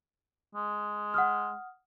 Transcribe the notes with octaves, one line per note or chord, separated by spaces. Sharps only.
G#3
F#5 D#6 F6